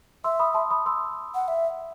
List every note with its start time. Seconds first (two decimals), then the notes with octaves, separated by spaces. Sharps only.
0.24 E5 C6 E6
0.39 B5 D#6
0.54 A5 C6
0.71 B5 D#6
0.86 C6 E6
1.35 F#5
1.48 E5